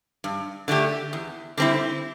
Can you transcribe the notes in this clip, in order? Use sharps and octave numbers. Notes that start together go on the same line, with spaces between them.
G2
D3 A3 D4 G4
E2
D3 G3 C4 E4